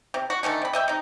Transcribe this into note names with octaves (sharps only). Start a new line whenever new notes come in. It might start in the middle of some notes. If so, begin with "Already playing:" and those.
C3
F#4
D3 D#3 G#3 A3
C3 B5
D#5 E5 G5
C3 D#4